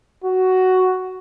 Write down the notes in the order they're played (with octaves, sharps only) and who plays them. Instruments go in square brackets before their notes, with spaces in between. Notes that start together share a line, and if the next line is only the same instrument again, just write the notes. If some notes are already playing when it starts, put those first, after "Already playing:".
[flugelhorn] F#4